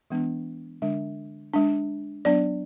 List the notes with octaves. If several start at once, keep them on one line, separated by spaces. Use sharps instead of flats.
E3 G#3 B3 D4
D3 G#3 D4
G#3 D4
F#3 B3 D4 D5